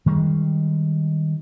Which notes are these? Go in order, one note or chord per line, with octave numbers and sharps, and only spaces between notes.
D#3 G3 G#3